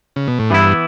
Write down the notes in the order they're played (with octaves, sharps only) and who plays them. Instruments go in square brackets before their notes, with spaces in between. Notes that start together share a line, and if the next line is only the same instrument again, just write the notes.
[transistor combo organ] C#3
B2
A2
[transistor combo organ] G2 [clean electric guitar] E3 B3 E4